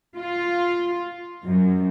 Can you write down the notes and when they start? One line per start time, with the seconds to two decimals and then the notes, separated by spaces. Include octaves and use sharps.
0.16 F4
1.44 F#2